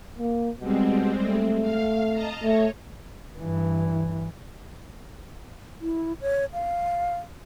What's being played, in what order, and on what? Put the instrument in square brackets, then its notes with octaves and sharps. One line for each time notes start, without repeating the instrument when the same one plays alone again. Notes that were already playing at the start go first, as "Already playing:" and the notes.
[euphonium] A#3
[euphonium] B2 [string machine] G3 G#3 C4
[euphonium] A3
[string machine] F5
D#5 A5 A#5
[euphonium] A3 [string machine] C#5
[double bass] G2 E3
[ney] E4
C#5
F5